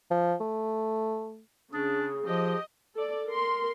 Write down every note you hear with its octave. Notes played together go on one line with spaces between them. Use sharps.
F3
A3
C#3 D4 G#4
F3 G4 D#5
A4 D5
A#4 C6